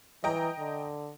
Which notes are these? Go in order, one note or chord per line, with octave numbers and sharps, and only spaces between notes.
E3 D#5 G5 A#5
D3